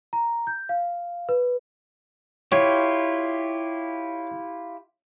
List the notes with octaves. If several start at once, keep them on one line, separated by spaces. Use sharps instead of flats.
A#5
G6
F5
B4
E4 F4 G4 C#5